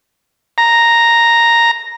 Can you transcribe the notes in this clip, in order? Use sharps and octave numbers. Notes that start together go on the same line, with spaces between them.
A#5